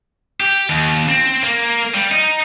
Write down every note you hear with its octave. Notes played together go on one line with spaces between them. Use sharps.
G4
D#2
C4
A#3
G3
D#4